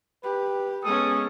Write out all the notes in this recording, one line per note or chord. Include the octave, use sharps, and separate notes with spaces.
G4 B4
G#3 B3 C#4 A4 D#6